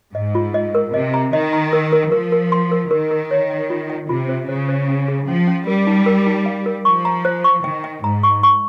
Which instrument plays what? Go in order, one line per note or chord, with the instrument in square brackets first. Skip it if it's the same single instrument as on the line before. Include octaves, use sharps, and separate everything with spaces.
[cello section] G#2 [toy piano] D#5
[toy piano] F4
D#5
A#4
[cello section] C3 [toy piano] D#5
[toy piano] A#5
[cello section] D#3 [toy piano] D#5
[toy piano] A#5
A#4
A#4
[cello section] F3 [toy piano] A#4
[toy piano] A#4
C6
A#4
[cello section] D#3 [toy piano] A#4
[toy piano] A#4
C#5
G5
F4
G5
[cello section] C3 [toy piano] F4
[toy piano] C5
[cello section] C#3 [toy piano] C5
[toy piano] C5
C#4
G#4
[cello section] F3 [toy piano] C#4
[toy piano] C#4
[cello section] G3 [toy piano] A#4
[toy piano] D#4
A#4
D#4
F5
A#4
[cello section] F3 [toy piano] C#6
[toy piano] A#5
C5
C#6
[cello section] D#3 [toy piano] G5
[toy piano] G5
[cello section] G#2 [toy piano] A#5
[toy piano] C#6
C#6